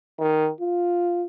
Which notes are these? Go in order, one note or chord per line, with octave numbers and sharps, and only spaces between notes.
D#3
F4